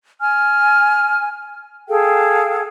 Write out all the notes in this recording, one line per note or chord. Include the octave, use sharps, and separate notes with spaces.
G#5 F6
G#4 A4 F5 G5